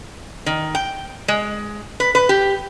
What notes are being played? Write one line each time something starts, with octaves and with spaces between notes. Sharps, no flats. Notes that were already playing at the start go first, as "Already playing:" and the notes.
D#3
G5
G#3
B4
B4
G4